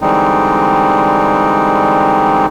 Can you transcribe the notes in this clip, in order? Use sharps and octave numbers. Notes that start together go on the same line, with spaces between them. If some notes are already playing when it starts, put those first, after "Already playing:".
D3 E3 G3 G#3 C4 D#4